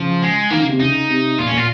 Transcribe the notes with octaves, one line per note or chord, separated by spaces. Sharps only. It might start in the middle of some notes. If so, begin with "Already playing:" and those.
Already playing: C#3 F3
G#3
D#3 A#3
C#3
C3
C#3 D#4
C3
A#2 F4
C#4
A#2
F4